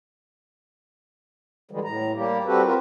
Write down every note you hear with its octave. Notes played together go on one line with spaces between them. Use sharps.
D3 E3 G3 G#3
A2 A#5
G3 A#3 G4
G3 C4 F#4 G4 A4 B4
C4 F4 A#4